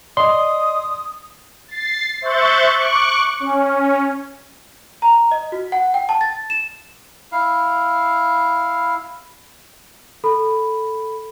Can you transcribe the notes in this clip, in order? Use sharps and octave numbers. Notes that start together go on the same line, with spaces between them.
D5 D#5 C6 D#6
A6 C7
C5 E5 C#6 F#6 G6 A6
C#6 D6 F#6
C#4
A#5
D#5
F#4
F#5
G5
A5
A6
E7
E4 F5
A4 B5